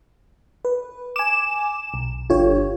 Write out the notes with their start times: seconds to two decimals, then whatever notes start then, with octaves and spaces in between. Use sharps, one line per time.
0.65 B4
1.16 G#5 D6 E7
1.94 B1
2.30 G1 F4 G4 C#5